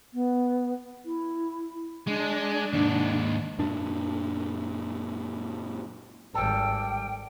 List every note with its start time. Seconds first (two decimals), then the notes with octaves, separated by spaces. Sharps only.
0.14 B3
1.05 E4
2.07 G#3 D4
2.73 D#2 G#2
3.59 F#2 A#2 D4
6.34 G#1 G3 A4 G5